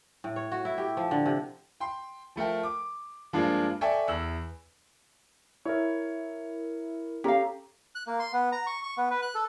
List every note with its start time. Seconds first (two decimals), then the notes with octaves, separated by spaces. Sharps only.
0.24 A2
0.36 C#5
0.52 F#4
0.65 E4
0.78 G4
0.97 F3
1.11 D3
1.26 C3
1.80 G5 C6
2.36 F3 A3 A#4 G5
2.63 D6
3.33 G2 F3 G#3 A#3 D4
3.81 A4 D5 E5 G5 G#5 C#6
4.07 E2 E6 F#7
5.65 E4 A#4 C#5
7.24 C#4 G4 A4 F5 A#5
7.95 F#6
8.07 A#3
8.20 C6
8.33 B3
8.52 A#5
8.67 C#6
8.83 C#6
8.97 B3
9.11 B4
9.22 F#6
9.35 A4